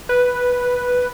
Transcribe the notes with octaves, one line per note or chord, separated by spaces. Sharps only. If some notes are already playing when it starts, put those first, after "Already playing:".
B4